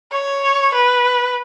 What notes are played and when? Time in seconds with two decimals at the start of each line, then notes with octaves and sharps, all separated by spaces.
0.12 C#5
0.75 B4